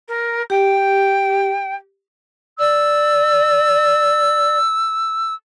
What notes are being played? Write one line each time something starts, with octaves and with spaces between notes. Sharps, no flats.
A#4
G4 G5
D5 E6